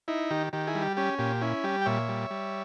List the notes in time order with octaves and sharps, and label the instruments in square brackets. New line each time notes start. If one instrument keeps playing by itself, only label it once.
[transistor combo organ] D#4 E4
D#3 G4
D#3 G4
E4 G#4
G3
G4
C#4 G4
A#2 G4
C#4 E4
G3 G4
G5
A#2 C#5 E5
G3
G3